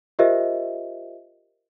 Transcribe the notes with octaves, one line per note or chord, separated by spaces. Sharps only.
F4 G4 A#4 C5 D#5 E5